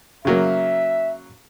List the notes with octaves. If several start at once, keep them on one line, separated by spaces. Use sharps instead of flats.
C#3 F#3 A#3 E5